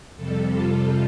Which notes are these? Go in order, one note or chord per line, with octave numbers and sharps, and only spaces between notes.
F2 C3 G3 A4
F4